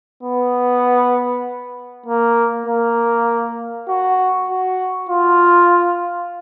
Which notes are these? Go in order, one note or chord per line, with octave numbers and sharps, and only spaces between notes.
B3
A#3
A#3
F#4
F#4
F4